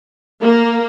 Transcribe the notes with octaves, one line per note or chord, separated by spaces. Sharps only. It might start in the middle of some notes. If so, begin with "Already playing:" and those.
A#3